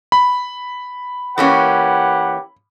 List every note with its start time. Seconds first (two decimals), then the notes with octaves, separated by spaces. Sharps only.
0.12 B5
1.38 E3 A#3 C#4 G4 B4 F#5